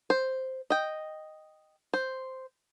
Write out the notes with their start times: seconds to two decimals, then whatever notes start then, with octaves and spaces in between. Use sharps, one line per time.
0.10 C5
0.70 D#5 G5
1.94 C5